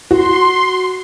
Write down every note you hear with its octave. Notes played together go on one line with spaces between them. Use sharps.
F#4 C6